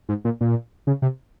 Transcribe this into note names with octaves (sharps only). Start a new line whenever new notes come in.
G#2
A#2
A#2
C#3
C3